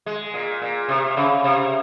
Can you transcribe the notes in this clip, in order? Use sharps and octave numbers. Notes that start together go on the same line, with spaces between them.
G#3
A#2
A#2
C3
C#3
C3